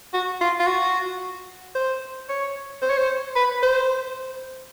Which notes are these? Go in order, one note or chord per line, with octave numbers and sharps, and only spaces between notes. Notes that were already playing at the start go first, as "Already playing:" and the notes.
F#4
F4
F4
F#4
C5
C#5
C5
C#5
C5
B4
C5